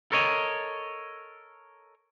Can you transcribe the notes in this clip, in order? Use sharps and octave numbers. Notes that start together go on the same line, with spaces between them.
A4 A#4 C#5 D#5